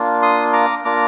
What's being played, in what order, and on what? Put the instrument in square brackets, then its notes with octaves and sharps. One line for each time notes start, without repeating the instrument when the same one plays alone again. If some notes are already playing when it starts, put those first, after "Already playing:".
Already playing: [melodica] A#3 D4 F4
C6 D#6
A#5 D6
A#3 D4 F4 A#5 D6